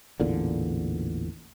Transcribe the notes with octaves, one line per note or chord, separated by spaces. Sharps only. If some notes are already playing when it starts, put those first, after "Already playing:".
A1 E2 A#2 D3